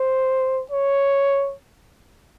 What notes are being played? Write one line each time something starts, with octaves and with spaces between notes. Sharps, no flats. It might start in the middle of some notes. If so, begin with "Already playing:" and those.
Already playing: C5
C#5